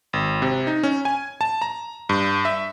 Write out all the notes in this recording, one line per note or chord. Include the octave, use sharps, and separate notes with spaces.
G#1
C3
D#4
C#4
G#5
A5
A#5
G2
E5